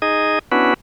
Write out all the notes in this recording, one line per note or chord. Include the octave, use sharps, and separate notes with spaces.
D#4 G#4 D#5
B3 C#4 D4 E4 F#4 B4